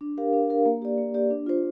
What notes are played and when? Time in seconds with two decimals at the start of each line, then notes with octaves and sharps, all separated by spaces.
0.01 D4
0.17 G4 A#4 F5
0.33 D4
0.49 G4 A#4 F5
0.66 A#3
0.82 G4 D5
0.98 A#3
1.14 G4 D5
1.31 D4
1.46 F4 C5